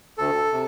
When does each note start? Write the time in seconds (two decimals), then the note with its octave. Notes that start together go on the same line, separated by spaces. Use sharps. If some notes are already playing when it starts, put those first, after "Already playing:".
0.18 D2 A4
0.53 C3